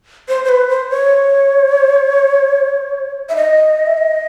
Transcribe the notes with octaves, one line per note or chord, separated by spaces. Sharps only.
C5
C5
B4
C5
C#5
E5
D#5
E5
D#5